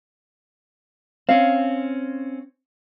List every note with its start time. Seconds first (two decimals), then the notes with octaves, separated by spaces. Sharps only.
1.29 C4 C#4 F5